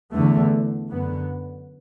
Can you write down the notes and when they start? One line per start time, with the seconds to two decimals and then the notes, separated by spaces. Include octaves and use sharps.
0.12 E2 D3 A3
0.89 F#2 D3 B3